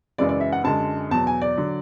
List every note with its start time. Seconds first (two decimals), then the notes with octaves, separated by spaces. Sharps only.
0.18 F#2 C#3 E3 G#3 D5
0.29 D5
0.41 E5
0.52 F#5
0.64 F#2 D3 G#3 A5
1.10 E2 B2 F#3 A5
1.27 G#5
1.42 D5
1.57 D3 F#3